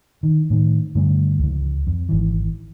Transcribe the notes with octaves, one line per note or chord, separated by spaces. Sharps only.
D#3
A2 D#3
G2 D3 A3
C#2 F3
F2
G#1 E3